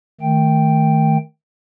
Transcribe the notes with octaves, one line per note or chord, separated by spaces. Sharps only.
D#3 A3 G5